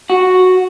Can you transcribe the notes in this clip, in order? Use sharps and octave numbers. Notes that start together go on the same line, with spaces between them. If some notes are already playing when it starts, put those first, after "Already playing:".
F#4